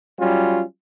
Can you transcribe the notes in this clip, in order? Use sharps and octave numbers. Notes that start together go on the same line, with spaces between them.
F#3 G3 C#4 F4